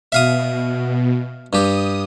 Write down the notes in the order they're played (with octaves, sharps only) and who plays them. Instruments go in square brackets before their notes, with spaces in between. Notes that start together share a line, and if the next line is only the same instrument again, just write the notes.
[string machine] B2 [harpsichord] E5 F5 D#6
[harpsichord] G2 G4 [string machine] D#6